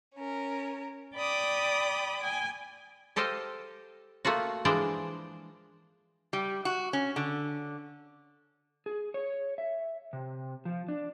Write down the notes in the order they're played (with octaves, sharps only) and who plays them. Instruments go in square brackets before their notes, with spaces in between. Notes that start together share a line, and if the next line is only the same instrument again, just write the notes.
[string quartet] C#4 A#4
D5 G5 B5 D6 D#6
G5 G#5
[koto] G4 A4 C5 D#5 F5 G5
A3 A#3 F4 F#4
E3 F3 G#3 D4 C5 D5
[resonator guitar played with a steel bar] G3
F#4
C#4
D3
[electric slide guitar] G#4
C#5
E5
C3
F3
D4